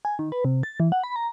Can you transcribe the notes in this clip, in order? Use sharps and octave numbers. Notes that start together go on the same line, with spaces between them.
G#5
D#3
B4
C3
A6
E3
F#5
B5
A#5